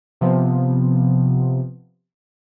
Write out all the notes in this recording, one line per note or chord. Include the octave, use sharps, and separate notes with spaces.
C3 F3 B3